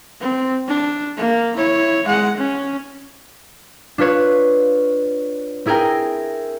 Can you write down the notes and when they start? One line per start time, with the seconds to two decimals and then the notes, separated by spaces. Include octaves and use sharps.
0.21 C4
0.68 D4
1.17 A#3
1.56 E4 C#5
2.06 G#3 F#5
2.37 C#4
3.98 D4 F4 B4 C#5
5.66 C4 E4 G#4 A#4 G5